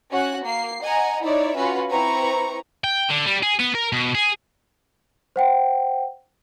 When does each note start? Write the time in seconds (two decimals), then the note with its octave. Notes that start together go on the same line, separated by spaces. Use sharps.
0.11 C#4 F#4 F#6
0.44 A#3 C7
0.82 D#5 F#5 G#5 A#5
1.23 D#4 E4 C#5 D5 E5
1.56 C#4 F4 F#4 B4
1.90 C4 E4 B4 A#5 C#6
2.84 G5
3.10 D3
3.26 G3
3.42 G#4
3.59 B3
3.75 A#4
3.92 B2
4.15 G#4
5.36 C5 F#5 G5